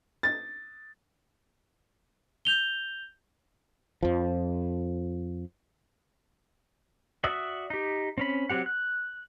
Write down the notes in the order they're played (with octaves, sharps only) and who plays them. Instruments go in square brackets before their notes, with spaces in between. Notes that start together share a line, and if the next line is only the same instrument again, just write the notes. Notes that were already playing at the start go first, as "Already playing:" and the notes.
[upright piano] A6
[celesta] G6 F7 G7
[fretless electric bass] F2 F3
[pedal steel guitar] F#4 D5 E5 D#6 E6
D#4 G4
C4 C#4 B5
F#3 C4 G4 F#5
F#6